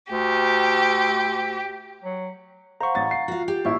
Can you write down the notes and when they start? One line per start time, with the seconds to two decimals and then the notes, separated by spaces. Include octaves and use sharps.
0.12 D2 G4
2.04 F#3
2.81 C5 F5 F#5 A#5 C#6
2.95 A1 A6
3.11 C7
3.28 F4 F#4 F5
3.48 G4
3.65 A1 A#2 E4 C#6 E6